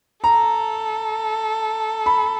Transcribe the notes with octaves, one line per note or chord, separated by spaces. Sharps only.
A4 A#5
B5